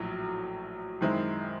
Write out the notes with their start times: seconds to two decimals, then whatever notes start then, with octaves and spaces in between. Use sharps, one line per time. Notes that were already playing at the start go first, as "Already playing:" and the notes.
Already playing: A#1 A2 F#3
1.01 F#2 D#3 G#3 C4 E4